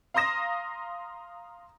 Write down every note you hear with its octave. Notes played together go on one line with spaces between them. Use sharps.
F5 A#5 C6 D#6 A#6 E7